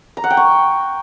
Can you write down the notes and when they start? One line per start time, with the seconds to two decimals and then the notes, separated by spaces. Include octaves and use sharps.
0.17 A#5
0.24 F#5
0.30 G5
0.37 C#6